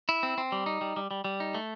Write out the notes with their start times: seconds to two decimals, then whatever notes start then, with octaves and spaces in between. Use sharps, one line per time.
0.09 E4
0.23 C4
0.38 C4
0.52 G3
0.66 D#4
0.81 G3
0.96 G3
1.11 G3
1.24 G3
1.40 D#4
1.55 A3